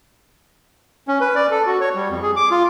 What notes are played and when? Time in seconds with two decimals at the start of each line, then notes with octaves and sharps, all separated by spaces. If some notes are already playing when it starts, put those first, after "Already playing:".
1.08 C#4
1.20 B4
1.35 D5
1.51 A4
1.66 F#4
1.81 C#5
1.95 G3
2.10 F2
2.22 G#4
2.36 D6
2.51 F4